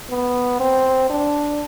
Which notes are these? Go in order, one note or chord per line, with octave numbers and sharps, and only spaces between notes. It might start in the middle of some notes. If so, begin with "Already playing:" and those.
B3
C4
D4